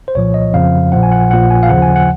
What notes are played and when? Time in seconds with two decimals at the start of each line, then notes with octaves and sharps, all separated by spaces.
0.08 C5
0.15 C2 A#2 F3 C#5
0.34 D#5
0.53 F2 C#3 F3 F5
0.92 A#1 A#2 F3 F#5
1.03 G#5
1.12 F#5
1.31 A#1 A#2 F3 F#5
1.50 G#5
1.63 F5
1.69 D#2 C#3 F3 F#5
1.82 G#5
1.96 F#5